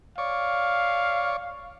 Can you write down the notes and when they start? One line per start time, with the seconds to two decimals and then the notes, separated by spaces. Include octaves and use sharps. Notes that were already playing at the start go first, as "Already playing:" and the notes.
0.18 C#5 D5 F5 C#6